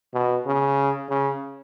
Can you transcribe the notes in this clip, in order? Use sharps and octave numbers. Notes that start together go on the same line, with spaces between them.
B2
C#3
C#3